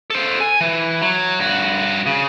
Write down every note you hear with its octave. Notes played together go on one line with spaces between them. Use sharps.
A4 C5
G#5
E3
F#3
G2 F#4
C#3